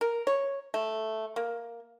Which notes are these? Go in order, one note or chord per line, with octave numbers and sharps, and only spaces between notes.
A#4
C#5
A3
A#3